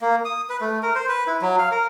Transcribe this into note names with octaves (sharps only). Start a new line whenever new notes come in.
A#3
D#6
B4
A3
A#4
C5
B4
E4
F#3
F5
A#4